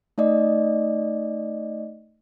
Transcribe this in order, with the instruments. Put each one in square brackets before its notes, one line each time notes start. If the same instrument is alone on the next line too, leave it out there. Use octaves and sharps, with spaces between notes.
[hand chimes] A3 D#4 D5 D#5